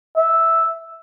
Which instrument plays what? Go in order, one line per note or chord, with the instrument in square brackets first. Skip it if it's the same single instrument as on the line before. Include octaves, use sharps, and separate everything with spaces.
[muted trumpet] E5